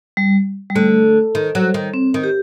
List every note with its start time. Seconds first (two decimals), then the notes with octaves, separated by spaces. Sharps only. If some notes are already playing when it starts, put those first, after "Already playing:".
0.17 G3
0.70 G3
0.75 D3 A3
1.35 D#3
1.55 F#3
1.74 D#3
1.94 C4
2.14 D#3
2.24 G4